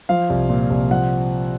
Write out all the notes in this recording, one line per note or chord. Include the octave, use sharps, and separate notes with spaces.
F3 F5
C2
A#2
C2
F3 F#5